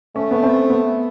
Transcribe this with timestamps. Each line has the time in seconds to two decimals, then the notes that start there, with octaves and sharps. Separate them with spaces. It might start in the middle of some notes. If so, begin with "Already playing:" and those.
0.16 A3 C#4
0.31 B3
0.43 C4
0.70 B3